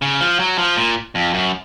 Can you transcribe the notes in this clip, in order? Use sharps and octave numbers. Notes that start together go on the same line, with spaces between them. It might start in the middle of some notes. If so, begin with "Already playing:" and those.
C#3
F3
F#3
F3
A#2
F2
F#2